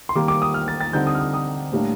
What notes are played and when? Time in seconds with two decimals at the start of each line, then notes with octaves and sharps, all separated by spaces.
0.09 C6
0.15 D#3 G3 A#3 D6
0.28 D6
0.42 D#6
0.54 F6
0.68 A6
0.81 A6
0.93 D3 G3 C4 D#4 G6
1.07 D#6
1.15 F6
1.20 D#6
1.34 D#6
1.72 A2 G3 A#3 D4